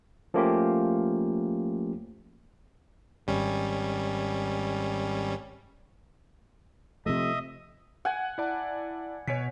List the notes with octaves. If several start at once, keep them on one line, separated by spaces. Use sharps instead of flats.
F3 A3 A#3 C#4 F4 G4
G#1 G3 C#4
C3 F3 A3 D#5 E5 D#6
F#5 G#5
E4 D5 A5
B2 C#5 G#5 B6